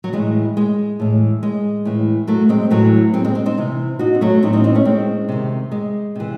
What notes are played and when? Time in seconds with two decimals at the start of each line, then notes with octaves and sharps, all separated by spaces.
0.04 F#3
0.13 A2 E3 G#3
0.57 G#3
1.00 A2 E3
1.43 G#3
1.85 A2 E3
2.27 F#3 A3
2.49 G#3 C4
2.70 A2 E3 F#3 A3
3.14 G#3 C4
3.25 G#3 C4
3.35 G#3 C4
3.46 C4 D#4
3.58 C3 E3
3.99 D#4 F#4
4.15 C4
4.21 F#3 A3
4.43 A2 E3 C4 D#4
4.53 C4 D#4
4.64 C4 D#4
4.75 A3 C#4
4.85 G#3 C4
5.29 C3 D#3
5.72 G#3
6.15 C3 E3